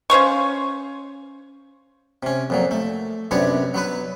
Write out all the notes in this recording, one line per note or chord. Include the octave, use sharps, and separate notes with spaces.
C#4 C5 F5 C#6
C3 C#4
F2 A#2 F#3
A3
F#2 C3 B3 D4 C#5
F#3 B3 B4